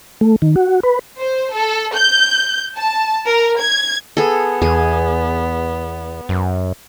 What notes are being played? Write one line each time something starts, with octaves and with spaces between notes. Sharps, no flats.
A3
D#3
F#4
B4
C5
A4
G6
A5
A#4
G#6
B3 G#4 A4
E2 G#4
F#2